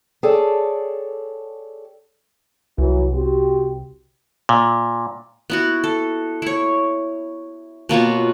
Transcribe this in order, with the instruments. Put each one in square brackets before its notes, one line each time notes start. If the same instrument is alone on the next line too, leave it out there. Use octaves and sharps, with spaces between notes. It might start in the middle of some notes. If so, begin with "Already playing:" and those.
[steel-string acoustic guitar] G#4 A4 C#5 D5 G5 A5
[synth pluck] C2 [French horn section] E3 F#3
[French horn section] C4 F#4 G4
[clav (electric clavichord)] A#2
[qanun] B3 E4 F#4
A4
E4 C#5
B2 A#3 F4 C#5